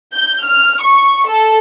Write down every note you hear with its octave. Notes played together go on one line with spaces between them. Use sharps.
G6
F6
C#6
A4